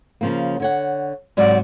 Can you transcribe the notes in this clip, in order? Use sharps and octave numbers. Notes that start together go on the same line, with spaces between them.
C#3 F3 A#3
D3 C#5 F#5
G#2 C3 F#3 D5